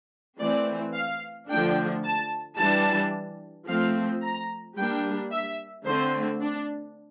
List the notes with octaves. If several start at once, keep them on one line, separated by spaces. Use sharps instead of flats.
E3 A3 C4 D5
F5
D3 F3 A3 D4 G5
A5
E3 G3 D4 A5
F3 A3 C4 F5
A#5
G3 A#3 D4 G5
E5
D3 A3 C4 C5
D4